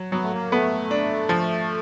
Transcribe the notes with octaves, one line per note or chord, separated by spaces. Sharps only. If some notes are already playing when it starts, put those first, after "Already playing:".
Already playing: F#3
F#3 B3
A3
A#3
A3 B3
D4
F3